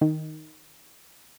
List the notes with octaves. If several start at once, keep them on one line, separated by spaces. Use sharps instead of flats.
D#3